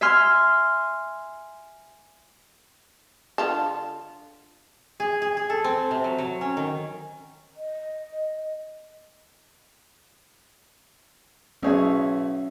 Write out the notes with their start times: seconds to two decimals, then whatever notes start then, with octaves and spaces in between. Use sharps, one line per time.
0.01 E5 G#5 C6 F6
3.38 D3 F4 A5
5.00 G#4
5.22 G#4
5.37 G#4
5.50 A4
5.64 C4
5.91 C3
6.04 F#3
6.18 F#3
6.41 C#4
6.57 D#3
7.55 D#5
11.63 B1 C#4 G#4 C#5 E5